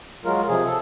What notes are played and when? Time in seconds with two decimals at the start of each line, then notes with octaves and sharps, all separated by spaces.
0.25 F#3 G#3 F4 A#4
0.48 C3 F3 G#4
0.66 A4